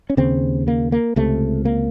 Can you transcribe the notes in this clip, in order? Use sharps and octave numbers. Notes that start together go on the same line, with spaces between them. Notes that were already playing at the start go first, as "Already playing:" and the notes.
C#4
D#2 C#3 C4
A#3
A#3
C#2 C3 A3
A#3